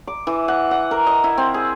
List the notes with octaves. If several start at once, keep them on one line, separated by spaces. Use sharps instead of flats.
D6
E3
F#5
F#5
A#4
D#5
E4
C4
G#4